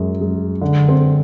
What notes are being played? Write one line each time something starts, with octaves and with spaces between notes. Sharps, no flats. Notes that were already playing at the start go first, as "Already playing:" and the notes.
Already playing: F#2 G#3
G#3
D3
C4